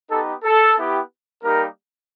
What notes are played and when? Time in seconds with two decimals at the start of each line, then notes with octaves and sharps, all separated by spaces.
0.09 B3 D#4 G4 A4
0.43 A4
0.77 B3 E4 G4
1.42 G3 A#3 D#4 G4 A#4